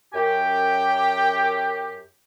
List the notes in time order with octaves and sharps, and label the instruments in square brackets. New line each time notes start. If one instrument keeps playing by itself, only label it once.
[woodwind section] F#2 G4 [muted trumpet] G5